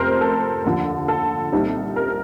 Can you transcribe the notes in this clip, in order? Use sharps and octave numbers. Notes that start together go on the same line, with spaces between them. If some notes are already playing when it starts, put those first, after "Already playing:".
Already playing: F2 C3 F3 A3 A#4 C5
A4
D#2 D3 F3
A4
C2 A#2 G3 C4 D#4
A#4